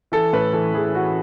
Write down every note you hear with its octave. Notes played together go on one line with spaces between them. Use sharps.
E3 A4
A2 B4
E3 A4
E3 G#4
E3 F#4